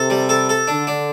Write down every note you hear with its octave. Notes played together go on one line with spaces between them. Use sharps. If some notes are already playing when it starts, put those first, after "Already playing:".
Already playing: C3 A4
G3
A4
A4
D3 D4
D4